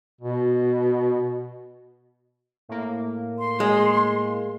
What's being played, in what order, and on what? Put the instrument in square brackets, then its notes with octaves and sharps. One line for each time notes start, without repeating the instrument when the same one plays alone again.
[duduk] B2
[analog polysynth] A2 A#3
[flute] C6
[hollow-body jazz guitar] G#3